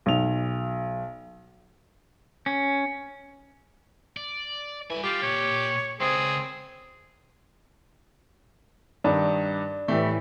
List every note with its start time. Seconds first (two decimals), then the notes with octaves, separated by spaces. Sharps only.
0.06 B1 F7
2.46 C#4
4.17 D5
4.90 G2 E3 G#5
5.04 G3 F4 G4
5.22 A#2 C#5
6.01 C#2 C4 G#4
9.04 G2 D#3 D4
9.88 A2 E3 A3 G4